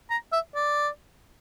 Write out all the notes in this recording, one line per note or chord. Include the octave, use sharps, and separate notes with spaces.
A#5
E5
D5